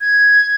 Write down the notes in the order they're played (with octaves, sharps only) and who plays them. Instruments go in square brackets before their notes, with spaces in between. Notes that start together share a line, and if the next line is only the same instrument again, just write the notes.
[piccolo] G#6